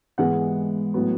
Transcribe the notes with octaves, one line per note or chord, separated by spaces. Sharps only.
G#2 E3 G#3 B3 F#5
A2 F#3 B3